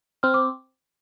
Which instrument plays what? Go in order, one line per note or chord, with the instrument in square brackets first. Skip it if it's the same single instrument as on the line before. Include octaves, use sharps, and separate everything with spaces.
[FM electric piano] C4 [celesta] F6
[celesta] D6